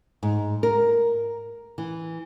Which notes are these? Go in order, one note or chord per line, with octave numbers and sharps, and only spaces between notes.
G#2
A#4
E3